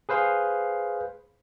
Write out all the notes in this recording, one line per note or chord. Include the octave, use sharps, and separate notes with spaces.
G#4 B4 C5 F5